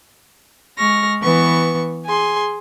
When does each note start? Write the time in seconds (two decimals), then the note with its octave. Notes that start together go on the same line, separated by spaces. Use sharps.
0.78 G#3 C#6 F6 A#6
1.22 E3 B3 C#6
2.05 G#4 G#5 C6